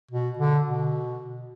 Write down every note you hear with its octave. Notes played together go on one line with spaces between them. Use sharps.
B2
D3
B2